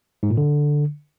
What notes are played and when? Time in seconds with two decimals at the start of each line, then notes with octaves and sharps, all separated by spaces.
0.23 G#2
0.30 A#2
0.37 D3